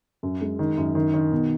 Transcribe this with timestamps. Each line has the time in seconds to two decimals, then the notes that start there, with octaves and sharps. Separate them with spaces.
0.23 F#2
0.41 G#3
0.59 D#3
0.77 F#2
0.95 D#3
1.14 D#3
1.32 B2